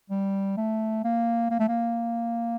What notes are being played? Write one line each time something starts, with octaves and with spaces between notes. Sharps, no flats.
G3
A3
A#3
A#3
A3
A#3